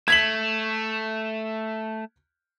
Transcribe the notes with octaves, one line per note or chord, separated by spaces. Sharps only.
A3 G#6 B6 F#7